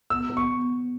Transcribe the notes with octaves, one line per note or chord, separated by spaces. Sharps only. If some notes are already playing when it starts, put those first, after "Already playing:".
B3 E6
B3
C#6